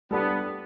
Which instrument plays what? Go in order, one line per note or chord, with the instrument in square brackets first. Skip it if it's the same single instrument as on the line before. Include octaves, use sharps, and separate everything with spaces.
[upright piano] G3 D4 A4 D5 [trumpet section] B3